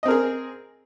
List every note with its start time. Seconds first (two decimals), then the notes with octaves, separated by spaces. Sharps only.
0.03 D#5
0.05 C4
0.08 A#4
0.11 G#4